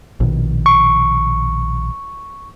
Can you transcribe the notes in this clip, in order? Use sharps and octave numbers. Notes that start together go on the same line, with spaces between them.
A#1 B2 D#3
C#6